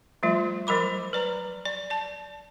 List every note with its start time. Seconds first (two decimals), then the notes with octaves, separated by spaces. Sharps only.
0.23 F3 G3 A3 F4
0.67 F3 F#3 A#4 B5 D6
1.13 B4 D5 A#5
1.65 D5
1.90 D5 A5